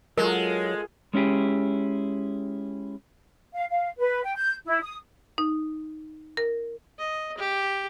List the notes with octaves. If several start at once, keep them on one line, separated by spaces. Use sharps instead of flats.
F#3 G#3 F4 A4 A#4
G#3 C#4 E4 G4 G#4
F5
F5
B4
G5
G6
E4
D#6
D#4
A#4
D#5
G4